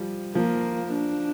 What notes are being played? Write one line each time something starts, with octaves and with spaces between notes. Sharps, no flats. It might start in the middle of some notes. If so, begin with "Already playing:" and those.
Already playing: F3 G3
F3 A#3
D4